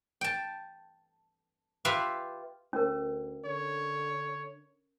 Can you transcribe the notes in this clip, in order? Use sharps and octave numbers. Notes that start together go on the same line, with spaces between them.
G5 A5
F4 G4 B4 E5 F5
D2 C#4 A#4
D3 C#5